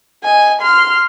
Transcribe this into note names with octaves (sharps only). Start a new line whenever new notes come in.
D#5 G#5
C6 F6